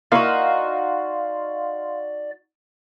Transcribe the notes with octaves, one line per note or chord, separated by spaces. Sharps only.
A#3 D#4 E4 F#4 A#4 D5 F5 C6